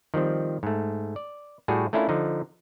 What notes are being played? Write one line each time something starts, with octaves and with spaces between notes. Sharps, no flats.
D#3 F3 G3 C4
G#2 A3
D5
A2 G3 F#4 G#4
A3 C#4 D4 E4 F4 A#4
D3 F3 D#4